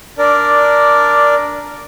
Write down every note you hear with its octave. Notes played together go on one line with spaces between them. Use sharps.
D4 A#4 D5